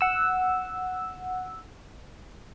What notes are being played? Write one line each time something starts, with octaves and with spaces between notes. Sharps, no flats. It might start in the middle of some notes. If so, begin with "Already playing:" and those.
F#5 E6